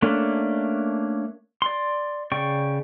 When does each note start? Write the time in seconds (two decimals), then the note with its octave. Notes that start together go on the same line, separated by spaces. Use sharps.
0.02 A3 A#3 C#4 D4
1.62 D5 C6
2.32 C#3 D5 G5 C#6